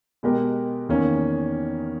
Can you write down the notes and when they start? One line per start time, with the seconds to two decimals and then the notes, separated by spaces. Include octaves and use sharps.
0.23 B2 G#3 B3 G4 A#4
0.89 E2 D#3 A#3 C#4